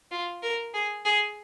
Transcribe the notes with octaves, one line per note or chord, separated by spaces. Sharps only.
F4
A#4
G#4
G#4